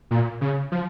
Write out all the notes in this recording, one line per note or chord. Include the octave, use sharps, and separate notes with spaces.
A#2
C#3
F3